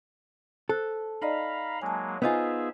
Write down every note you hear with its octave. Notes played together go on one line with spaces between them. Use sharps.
A4 C5 F#6
D#4 D5 D#5 F5 A#5 B5
F#3 G#3 A#3 G#5 A5
B3 D#4 F4 G#4 C5 E5 G#5